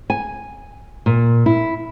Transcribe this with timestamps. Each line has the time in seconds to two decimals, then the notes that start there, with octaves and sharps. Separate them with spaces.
0.10 G#5
1.06 A#2
1.46 E4